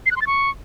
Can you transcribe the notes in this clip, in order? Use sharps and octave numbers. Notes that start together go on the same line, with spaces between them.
C7
F#6
C6
A6
C#6